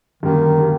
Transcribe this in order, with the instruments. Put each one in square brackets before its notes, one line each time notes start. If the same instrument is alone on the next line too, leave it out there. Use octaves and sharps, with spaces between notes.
[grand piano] F#2 D3 G3 A#3 [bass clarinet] D#3
[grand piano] D3 G3 A#3